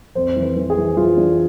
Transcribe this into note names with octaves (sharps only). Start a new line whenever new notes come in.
F2 C5
E3
B4
E3
G#4
E3
E3 F4
E3 D4